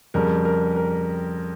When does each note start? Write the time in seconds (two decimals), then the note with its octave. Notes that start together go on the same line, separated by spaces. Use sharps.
0.14 F2 C#3 G3 A#4
0.45 A#4
0.76 A#4